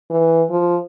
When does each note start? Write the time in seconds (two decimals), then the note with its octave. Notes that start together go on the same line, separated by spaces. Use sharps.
0.10 E3
0.50 F3